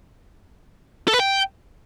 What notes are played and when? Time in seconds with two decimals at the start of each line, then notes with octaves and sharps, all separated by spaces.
1.08 A4
1.14 B4
1.20 G5